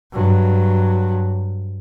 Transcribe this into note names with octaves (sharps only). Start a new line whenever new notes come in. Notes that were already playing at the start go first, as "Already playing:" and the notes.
G2 F#3